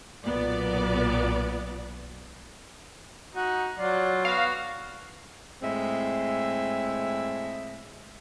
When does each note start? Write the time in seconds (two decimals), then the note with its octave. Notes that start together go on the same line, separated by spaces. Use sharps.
0.24 B1 A#2 B3 D5
3.35 D#4 F#4
3.79 F#3 F4 D5
4.25 B3 F#4 F5
5.62 A2 G#3 C4 E5